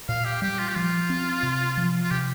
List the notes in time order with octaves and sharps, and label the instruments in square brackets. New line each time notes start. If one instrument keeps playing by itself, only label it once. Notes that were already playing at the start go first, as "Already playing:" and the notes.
[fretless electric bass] A#2 [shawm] F5
[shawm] G4
[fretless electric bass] G3 [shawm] G4
[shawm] F4
G4
[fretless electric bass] F3 [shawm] F4
[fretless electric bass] C4
C3
F3
[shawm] F4
[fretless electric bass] C3 [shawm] G4